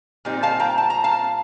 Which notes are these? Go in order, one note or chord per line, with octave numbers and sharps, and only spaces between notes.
A#2 G3 C4 D#4
F5 A5
G5 A#5
A5
A#5
F5 A5